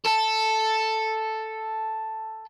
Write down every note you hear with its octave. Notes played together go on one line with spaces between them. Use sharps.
A4 A5